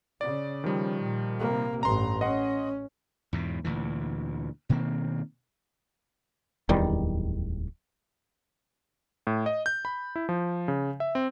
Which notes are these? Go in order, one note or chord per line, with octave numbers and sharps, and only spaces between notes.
C#3 D5
D#3 F3 G3
A#2
C3 A#3
A1 G2 A#5 C6
C#4 D#5 F#5 C6
E2 G#2 B2
D2 A#2 E3
B2 D#3 A#3 C4
D1 E2 D#3 G3
A2
D#5
G6
B5
E4
F3
C#3
E5
C4